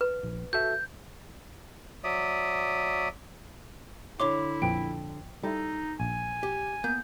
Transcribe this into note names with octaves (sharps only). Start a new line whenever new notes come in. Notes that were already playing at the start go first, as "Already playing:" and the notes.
B4
A#1
F#4 A4 E5 G6
F#3 D5 E5 D#6
D3 E4 C#5 C6 D6
A#1 F2 B4 G5
G3 D#4 E4 A4
A#1 G#5
G4
A#3 B3 G6